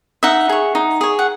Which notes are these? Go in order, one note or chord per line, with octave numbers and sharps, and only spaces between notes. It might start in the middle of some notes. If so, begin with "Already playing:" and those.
D#4 E5 F#5
G#4 C#5
D#4
G#4 C#5
F#5